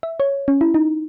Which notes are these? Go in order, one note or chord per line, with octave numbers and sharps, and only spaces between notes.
E5
C#5
C#4
E4
D#4